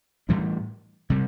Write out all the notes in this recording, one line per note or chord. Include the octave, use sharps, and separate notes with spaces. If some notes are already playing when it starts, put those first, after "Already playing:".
A2 E3 G3 D4
C3 G3